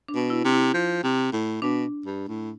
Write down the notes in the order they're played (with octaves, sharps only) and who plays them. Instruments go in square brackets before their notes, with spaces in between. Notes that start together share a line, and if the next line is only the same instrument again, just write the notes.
[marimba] D4
[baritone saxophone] B2
[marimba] E4
[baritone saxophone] C3
[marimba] E4
[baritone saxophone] F3
C3
A2
[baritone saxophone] B2 [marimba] D4
[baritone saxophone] G2
A2